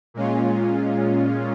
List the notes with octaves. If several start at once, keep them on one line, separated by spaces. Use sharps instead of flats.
A#2 G#3 C#4 F4